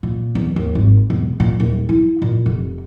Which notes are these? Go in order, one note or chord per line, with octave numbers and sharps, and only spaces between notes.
A#2
E2
D#2
G#1
E1
A#2
D#1
E4
A#2
F1